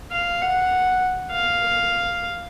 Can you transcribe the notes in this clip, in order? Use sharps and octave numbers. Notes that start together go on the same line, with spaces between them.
F5
F#5
F5